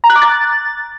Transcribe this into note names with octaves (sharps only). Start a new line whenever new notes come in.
A#5
F#6
D6
A6